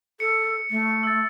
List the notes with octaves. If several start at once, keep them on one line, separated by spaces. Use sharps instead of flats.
A4 C#7
A3
E6 A6